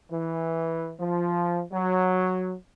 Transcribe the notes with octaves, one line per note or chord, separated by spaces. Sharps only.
E3
F3
F#3